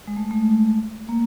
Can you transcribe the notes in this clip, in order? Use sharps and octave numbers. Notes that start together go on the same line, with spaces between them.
G#3
A3
A3
A#3